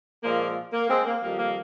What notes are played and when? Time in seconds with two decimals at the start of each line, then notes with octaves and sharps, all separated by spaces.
0.23 A#2 F3 G#3 A#3
0.73 A#3
0.89 G#3 C4
1.05 A#3
1.22 F2 D#3 G3 A#3
1.39 A#3